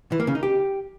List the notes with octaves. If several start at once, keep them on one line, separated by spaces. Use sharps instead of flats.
E3
A#3
C#3
D#4
G4